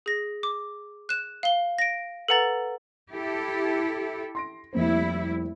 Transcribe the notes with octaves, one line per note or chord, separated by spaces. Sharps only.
G#4 A#6
D6
F#6 E7
F5 G7
A#6 D7
A4 B4 F#5 A#5 A6
E4 G4 A4
C6 A#6 D7
F1 G3 A#3 E4 C5